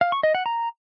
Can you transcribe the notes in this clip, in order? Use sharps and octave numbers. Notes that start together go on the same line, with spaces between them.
F5
C#6
D#5
F#5
A#5